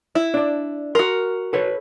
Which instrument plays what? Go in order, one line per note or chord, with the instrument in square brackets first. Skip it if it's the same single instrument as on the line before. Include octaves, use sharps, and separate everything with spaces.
[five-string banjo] E4
[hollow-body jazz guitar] D4 D5
[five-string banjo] F#4 A#4 [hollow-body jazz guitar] C6
[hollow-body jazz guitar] A4 B4 C#5